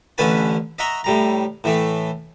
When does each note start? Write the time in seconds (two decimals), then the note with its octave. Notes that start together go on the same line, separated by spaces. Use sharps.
0.18 A1 D3 C#4 B4 G#5 A5
0.78 D#5 E5 F#5 A#5 C#6
1.04 A2 G3 A#5
1.64 A2 E3 A3